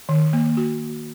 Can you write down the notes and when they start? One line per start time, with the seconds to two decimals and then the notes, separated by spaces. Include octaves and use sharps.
0.09 D#3
0.33 A#3
0.57 F#4